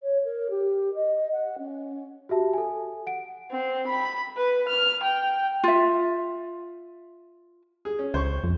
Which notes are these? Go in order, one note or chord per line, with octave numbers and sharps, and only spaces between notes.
C#5
A#4
G4
D#5
F#5
C#4
F#4 G4 E5 A5
A4 G#5
F#5 D7
C4
B5
B4
F6
G5
F4 E5
G#4
C#4
C#2 C5 C#6
F2